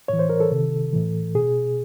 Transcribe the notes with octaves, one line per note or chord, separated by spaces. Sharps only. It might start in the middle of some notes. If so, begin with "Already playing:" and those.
A2 E3 C#5
C5
A#4
A4
C3 D#3
A2 E3
B2 G#4